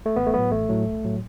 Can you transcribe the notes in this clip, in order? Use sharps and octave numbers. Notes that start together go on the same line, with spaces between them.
A3
A1 B3
A3
A2 F#3 B3
A1 A3
A2 F#3
B1
A2 F#3